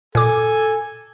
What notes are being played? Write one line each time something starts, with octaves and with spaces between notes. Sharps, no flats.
A#2 A4 G#5 D6